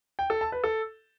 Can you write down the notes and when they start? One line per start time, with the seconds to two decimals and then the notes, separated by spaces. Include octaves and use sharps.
0.19 G5
0.30 A4
0.41 A5
0.52 B4
0.64 A4